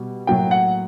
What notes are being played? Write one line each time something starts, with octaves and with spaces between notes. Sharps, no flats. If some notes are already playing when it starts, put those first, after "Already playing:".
Already playing: B2 G3
A2 F#3 A#3 G5
F#5